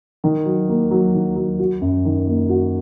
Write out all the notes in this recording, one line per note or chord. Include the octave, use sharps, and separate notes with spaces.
D#3
F#3
A#3
F#3
D#3
F#3
F#4
F#2
D#3
A#3
F#4